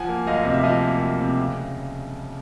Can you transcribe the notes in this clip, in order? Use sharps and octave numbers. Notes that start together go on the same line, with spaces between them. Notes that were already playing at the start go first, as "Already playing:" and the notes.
Already playing: F3 F#5 G#5
A#3
D2 D#5 F5
C3 D#5
E5
F3 D#5 F5
A#3
D2
C3
C#3